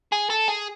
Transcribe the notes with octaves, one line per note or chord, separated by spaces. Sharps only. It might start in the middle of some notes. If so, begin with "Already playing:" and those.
G#4
A4
G#4